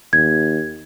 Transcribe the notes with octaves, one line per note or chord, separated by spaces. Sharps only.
D#2 G#6